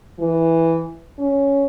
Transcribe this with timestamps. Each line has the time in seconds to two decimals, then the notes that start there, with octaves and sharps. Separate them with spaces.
0.19 E3
1.18 C#4